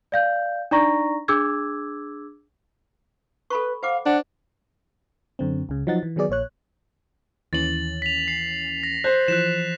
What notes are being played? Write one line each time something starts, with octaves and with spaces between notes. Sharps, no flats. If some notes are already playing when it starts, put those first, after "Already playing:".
D5 F5 G6
D4 D#4 D5 A#5 C#6 A#6
D4 G#4 D6 E6 G#6
A4 B4 B5 C#6
C5 F5 F#5 D6
D4 C5 F#5
F#2 D3 C4
C#2 C#3
F3 F#3 D#4 F#5 A6
E3
D#3 F#3 B3 G#4 D5
A#1 A#2 C#5 F#6
D#2 E3 C#4 A6 F#7
B6 F7
C7
A#6
C5 F#6
E3 F3 F#6 B6 E7